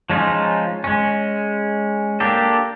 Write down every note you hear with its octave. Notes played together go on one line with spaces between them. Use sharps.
F3 G#3 C#4 D#4 F4
G#3 C#4
A#3 D4 G4 A4